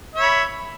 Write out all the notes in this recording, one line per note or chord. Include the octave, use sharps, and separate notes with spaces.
C#5 E5 B5